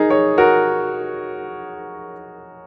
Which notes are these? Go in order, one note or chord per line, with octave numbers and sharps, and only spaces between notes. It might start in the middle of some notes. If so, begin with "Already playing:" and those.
Already playing: D#4 G#4 A#4
G#4 C#5
F#4 A#4